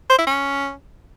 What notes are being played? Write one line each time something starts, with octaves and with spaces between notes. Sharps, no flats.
C5
E4
C#4